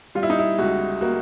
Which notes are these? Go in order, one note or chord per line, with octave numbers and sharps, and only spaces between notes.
G3 F4
E4
D#4
E4
C#2 F#4
A#3 F#4